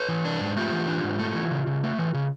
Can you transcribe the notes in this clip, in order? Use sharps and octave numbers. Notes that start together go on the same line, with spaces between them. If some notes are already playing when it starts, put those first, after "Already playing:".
Already playing: B4 C#5
E3
D4
G#2
A3 F4 G4
E3
D4
G#2
A3
E3
C#3
C#3
A3
E3
C#3